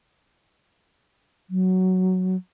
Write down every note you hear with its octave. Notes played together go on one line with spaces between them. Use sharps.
F#3